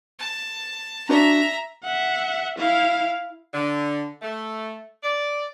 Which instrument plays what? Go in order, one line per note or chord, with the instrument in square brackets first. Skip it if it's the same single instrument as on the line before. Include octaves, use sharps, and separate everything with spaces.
[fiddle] A5
[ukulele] D4 F#4 D5 [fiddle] E5 A#5
[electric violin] E5 F#5
E4 F5
[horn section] D3
A3
D5